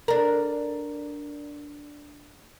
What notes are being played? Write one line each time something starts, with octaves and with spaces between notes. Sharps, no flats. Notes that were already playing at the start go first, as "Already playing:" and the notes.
D4 A#4